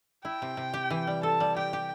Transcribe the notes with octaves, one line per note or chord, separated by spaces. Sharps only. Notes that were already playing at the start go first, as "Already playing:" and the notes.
E4 G5
C3
C3
G4
E3
G3
A4 A5
G3
G4 G5
G4